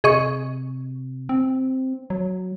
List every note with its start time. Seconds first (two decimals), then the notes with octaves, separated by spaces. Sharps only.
0.04 C3 G#4 D#5 C#6
1.29 C4
2.10 F#3